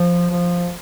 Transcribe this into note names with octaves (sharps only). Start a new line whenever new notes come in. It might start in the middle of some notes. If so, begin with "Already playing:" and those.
Already playing: F3
F3